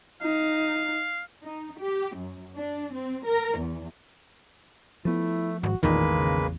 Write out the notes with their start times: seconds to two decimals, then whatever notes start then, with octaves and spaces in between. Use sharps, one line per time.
0.22 D#4 F5
1.44 D#4
1.80 G4
2.16 F#2
2.57 D4
2.94 C4
3.26 A#4
3.59 E2
5.05 F3 A3 B3 E4
5.63 G#1 F#4
5.83 A1 E2 A#2 D#3 E3 G#3 A#3 B4
6.07 C#3